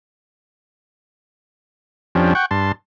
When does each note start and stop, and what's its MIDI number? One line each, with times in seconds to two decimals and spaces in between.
2.15 2.33 41
2.15 2.33 53
2.15 2.33 61
2.15 2.33 62
2.15 2.33 67
2.35 2.46 78
2.35 2.46 79
2.35 2.46 85
2.51 2.72 43
2.51 2.72 81
2.51 2.72 84